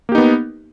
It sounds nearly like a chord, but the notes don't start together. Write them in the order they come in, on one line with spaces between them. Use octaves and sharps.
A#3 G4 D#4 B3